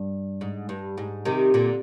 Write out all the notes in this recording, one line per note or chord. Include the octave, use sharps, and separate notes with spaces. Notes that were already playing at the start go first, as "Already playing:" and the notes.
Already playing: G2
G#2
G2
G#2
C3 D#3
A#2 D3